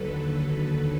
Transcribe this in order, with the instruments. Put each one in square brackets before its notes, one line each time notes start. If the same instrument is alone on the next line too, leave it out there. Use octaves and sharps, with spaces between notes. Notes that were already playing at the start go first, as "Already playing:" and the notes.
Already playing: [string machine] D#2 D3 F#3 A4 B4